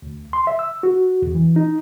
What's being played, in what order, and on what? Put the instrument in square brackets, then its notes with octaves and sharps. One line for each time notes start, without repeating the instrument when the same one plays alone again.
[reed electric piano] D2
C6
E5
E6
F#4
E2
E3
D#4